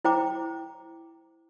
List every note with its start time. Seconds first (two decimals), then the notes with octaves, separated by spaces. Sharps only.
0.05 E4 C5 G5 A#5 D6